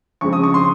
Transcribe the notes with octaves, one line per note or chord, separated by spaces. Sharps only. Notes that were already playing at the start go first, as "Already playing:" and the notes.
F2 C#3 G#3 C#6
D#6
C#6
C6